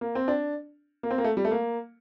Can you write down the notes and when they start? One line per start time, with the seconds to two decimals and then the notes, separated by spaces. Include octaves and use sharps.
0.01 A#3
0.15 C4
0.28 D4
1.03 A#3
1.11 C4
1.18 A#3
1.24 A3
1.37 G3
1.45 A3
1.51 A#3